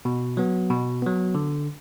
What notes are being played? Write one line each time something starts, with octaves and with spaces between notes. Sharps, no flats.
B2
F#3 B3
B2
F#3 B3
D3